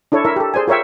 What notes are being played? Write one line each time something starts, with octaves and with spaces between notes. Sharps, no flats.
D4 E4 A4 C#5
E4 A#4 E5
G4 A4
G#4 C5 D5 G#5
F4 A#4 C#5 E5 G5